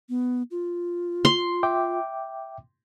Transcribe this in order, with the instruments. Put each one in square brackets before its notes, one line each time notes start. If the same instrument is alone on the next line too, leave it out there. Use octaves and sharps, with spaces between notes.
[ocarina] B3
F4
[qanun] C6
[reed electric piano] E5 G5 D6